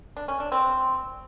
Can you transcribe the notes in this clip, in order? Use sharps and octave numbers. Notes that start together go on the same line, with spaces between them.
D4
C#4
D4
C4